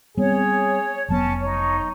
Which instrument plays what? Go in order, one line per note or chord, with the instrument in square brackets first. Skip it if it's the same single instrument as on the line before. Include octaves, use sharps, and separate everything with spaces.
[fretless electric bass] G3 B3 C4 [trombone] G#4 [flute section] C#5
[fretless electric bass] F1 F#3 B3 [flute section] C#4 A5
[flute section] D#4 [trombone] C#5